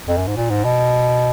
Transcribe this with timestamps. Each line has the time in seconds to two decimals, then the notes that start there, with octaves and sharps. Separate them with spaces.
0.08 F2
0.18 F#2
0.27 G#2
0.37 A#2
0.50 G#2
0.64 B2